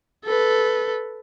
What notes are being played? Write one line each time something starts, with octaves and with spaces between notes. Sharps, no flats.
A4 B4